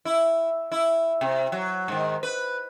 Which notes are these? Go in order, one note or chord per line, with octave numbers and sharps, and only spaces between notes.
E4
E4
C3
F#3
G#2 D#3
B4